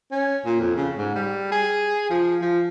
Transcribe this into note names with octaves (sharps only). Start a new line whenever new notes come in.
C#4
A#2
F2
C#3
G#2
G3
G#4
F3
F3